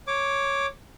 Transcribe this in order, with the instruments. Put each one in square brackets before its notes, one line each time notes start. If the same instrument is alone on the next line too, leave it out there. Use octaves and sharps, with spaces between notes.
[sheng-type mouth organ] C#5 D6